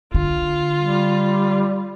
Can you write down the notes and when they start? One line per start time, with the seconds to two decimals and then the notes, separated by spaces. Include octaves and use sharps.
0.14 D3 F4
0.79 G3